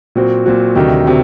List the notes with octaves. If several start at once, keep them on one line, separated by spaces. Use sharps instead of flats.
A#2 F#3 C4 F#4
A#2 F#3 C4 F#4
D2 C3 D#3 F#3
C3 D#3 F#3